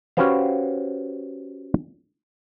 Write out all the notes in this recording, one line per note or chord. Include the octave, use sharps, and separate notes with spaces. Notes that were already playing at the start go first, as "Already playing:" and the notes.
C#4 F#4 G4 B4 C5 F5